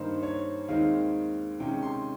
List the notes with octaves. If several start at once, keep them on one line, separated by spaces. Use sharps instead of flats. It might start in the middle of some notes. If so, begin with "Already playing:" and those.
Already playing: G2 D#3 A#3 D#4 C5
C#5
D#2 D#3 G#3 C4 D#4 F5
C3 D#3 G#3 C#4 G5
C6